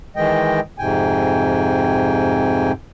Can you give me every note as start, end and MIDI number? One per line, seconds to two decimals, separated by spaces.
0.16 0.60 51
0.16 0.60 52
0.16 0.60 56
0.16 0.60 75
0.16 0.60 79
0.79 2.72 41
0.79 2.72 44
0.79 2.72 48
0.79 2.72 79
0.79 2.72 80